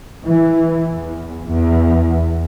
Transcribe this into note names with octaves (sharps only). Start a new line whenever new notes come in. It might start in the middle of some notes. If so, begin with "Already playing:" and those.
E3
E2
E2